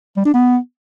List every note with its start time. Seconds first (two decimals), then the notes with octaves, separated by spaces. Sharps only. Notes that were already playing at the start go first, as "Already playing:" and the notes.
0.17 G3
0.25 D4
0.34 B3